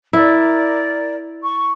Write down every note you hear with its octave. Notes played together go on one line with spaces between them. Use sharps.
E4 A#4 D5
C#6